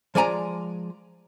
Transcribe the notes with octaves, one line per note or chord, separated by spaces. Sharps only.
F3 G#3 D5 G#5 A#5